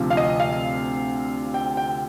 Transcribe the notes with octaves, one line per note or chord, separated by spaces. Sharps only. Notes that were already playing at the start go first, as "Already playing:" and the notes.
Already playing: D2 C3 F3
F5
D#5
F5
G5
G5